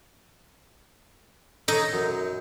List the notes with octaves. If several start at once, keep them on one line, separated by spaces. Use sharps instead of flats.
D#4 A4 C#5
F#2